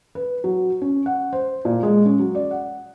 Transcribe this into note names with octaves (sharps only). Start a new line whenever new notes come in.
B4
F#3
C#4
F#5
C5
A#2
G#3
C#4
F#3
D5
F#5